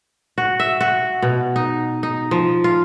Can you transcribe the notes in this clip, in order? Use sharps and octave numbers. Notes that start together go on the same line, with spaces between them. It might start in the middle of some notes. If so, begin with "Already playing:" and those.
F#4
E5
F#4
B2
D#4
D#4
F3
F4